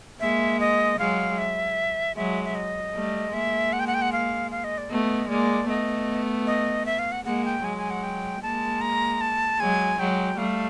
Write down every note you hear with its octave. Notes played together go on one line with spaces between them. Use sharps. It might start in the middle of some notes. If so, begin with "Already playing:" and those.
G#3 A#3 E5
D#5
F#3 G#3 F5
E5
F#3 G#3 E5
E5
D#5
G3 A3
G#3 A#3 E5
F#5
G5
F#5
G5
F#5
F5
F5
D#5
D5
A3 B3 D#5
G#3 A#3 D5
A3 B3 D#5
D#5
E5
F5
F#5
G#3 A#3 F#5
G5
F#3 G#3 G#5
G#5
F#5
G5
G#3 A#3 A5
A#5
A5
F#3 G#3 G#5
F#3 G#3 G5
G3 A3 F5